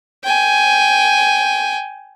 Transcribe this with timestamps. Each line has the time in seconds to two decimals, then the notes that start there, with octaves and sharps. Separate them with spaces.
0.24 G5 G#5